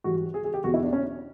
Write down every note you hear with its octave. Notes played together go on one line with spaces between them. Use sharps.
G#2 E3 G3 F#4
G#4
G#4
G4
E2 B2 G#3 F#4
E4
D4
C#4